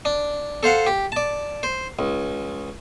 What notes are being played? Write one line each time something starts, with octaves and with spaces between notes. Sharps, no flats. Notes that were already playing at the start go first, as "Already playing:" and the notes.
D4
A4 C5 F5 F#5
G4
D5 A5
C5
C#2